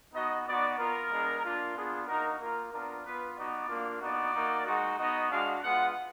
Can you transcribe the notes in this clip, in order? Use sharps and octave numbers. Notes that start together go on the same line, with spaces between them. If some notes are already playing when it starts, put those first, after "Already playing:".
B3 D#4 F#4 D#5
B3 D#4 F#4 D5
B3 F4 A#4
G#3 B3 D4
A#3 D4 F4
B3 D4 F4 G#4
A#3 D#4 F#4 A#4
A#3 F4 A#4
B3 D4 F4 A#4
B3 F4 B4
B3 D#4 F#4 D5
A#3 D4 F4
B3 D#4 F#4 D5
A#3 D#4 F#4
G#3 D#4 F#4
B3 D#4 F#4 D#5
G#3 D4 F#4 F5
G#3 B3 F4 F#5